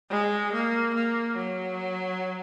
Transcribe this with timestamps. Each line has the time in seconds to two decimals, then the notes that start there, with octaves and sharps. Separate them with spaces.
0.11 G#3
0.53 A#3
0.95 A#3
1.37 F#3